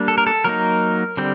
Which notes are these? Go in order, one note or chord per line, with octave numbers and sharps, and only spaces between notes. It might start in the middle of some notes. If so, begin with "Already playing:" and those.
Already playing: G3 A#3 D4
A4
A#4
A4
F#3 A#3 D#4 A#4
D3 G3 C4